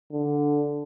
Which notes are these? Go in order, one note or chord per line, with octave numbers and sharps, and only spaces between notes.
D3